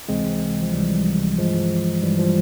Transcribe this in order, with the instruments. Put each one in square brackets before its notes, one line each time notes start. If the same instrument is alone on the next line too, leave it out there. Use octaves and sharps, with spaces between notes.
[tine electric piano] C#2 C3 E3 G#3 C4
F3
C#2 C3 E3 G3
G2 E3 F3 G#3
G2 E3 G3
F3